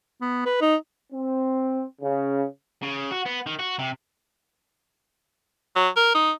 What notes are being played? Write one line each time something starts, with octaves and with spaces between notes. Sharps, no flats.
B3
B4
D#4
C4
C#3
C#3
F#4
B3
D#3
F#4
C3
F#3
A#4
D#4